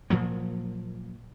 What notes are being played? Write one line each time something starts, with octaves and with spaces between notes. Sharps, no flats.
A#2 F3 F#3 A#3